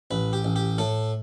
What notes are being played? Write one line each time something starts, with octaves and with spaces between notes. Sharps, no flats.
A1 B4
G4
A1
G4
A2 A4